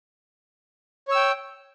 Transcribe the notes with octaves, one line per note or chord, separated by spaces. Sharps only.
C#5 G5 E6